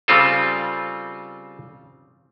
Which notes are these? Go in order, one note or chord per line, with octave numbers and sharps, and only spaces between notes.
C#3 G3 C4 F4 A4